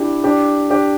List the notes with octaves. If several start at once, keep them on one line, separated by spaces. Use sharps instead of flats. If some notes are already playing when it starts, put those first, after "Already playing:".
Already playing: D4 E4 G4
D4 G4
D4 G4